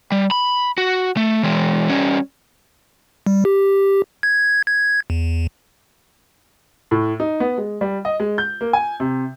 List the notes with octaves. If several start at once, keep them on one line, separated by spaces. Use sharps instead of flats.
G3
B5
F#4
A3
E3 G#3
G3 C#4
G3
G4
G#6
G#6
E2
A2
D#4
B3
G#3
G3
D#5
G#3
G6
A#3
G#5
C3